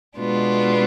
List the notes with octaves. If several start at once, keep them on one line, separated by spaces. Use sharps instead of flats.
B2 G#3 B3 D4 F4